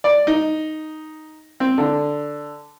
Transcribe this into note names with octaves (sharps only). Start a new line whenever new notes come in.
D5
D#4
C4
D3